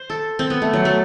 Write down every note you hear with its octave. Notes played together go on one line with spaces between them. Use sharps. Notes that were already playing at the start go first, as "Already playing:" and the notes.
Already playing: C5
A4
C4
B3
A3
F#3
A3